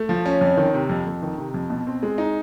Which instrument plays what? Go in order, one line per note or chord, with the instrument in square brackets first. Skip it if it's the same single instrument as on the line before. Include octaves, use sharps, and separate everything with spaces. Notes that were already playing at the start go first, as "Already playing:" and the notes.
Already playing: [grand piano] A3
F3
C#4
F2
D#3
C3
F2
F2
D#3
C3
F2
B2
C4
G#3
D#4